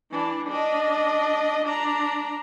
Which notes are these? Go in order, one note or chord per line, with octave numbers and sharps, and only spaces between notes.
E3 D4
D4 D#5
D4 A#5